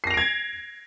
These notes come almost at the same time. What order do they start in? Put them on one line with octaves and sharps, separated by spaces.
C7 A#6 F7 D7 G#6